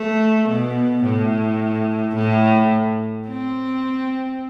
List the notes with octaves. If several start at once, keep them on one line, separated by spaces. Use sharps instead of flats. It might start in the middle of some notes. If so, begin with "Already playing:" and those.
Already playing: A3
B2
A2
A2
C4